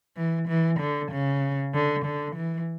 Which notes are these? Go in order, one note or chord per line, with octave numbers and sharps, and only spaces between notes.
E3
E3
D3
C#3
D3
D3
E3